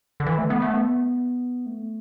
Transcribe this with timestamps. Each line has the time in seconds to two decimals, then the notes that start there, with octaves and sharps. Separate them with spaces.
0.20 D3
0.26 E3
0.38 A3
0.50 B3
0.62 A3
0.74 B3
1.66 A3